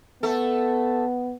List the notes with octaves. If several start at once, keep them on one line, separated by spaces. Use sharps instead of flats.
A3 B3 A4